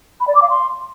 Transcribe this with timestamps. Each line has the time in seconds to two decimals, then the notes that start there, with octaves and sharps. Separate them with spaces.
0.20 B5
0.27 D5
0.35 D6
0.42 F5
0.49 C6